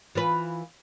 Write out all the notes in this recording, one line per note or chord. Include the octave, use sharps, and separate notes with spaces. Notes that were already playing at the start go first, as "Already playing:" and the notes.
E3 F4 B4